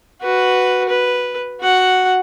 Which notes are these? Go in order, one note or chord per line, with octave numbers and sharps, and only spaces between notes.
F#4 B4
B4
F#4 F#5